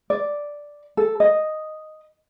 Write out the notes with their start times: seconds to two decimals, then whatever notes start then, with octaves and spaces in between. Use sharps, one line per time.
0.10 D5
0.97 A4
1.20 D#5